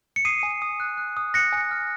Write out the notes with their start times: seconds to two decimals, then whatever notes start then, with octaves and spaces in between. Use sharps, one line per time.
0.16 C#7
0.25 D#6 C7 D#7
0.43 G#5
0.62 D#6
0.80 F#6
0.97 F#6
1.17 D#6
1.34 F#6 A#6 C#7
1.53 G#5
1.71 F6